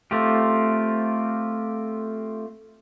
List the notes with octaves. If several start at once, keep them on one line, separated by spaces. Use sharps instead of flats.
A3 C4 F4 G4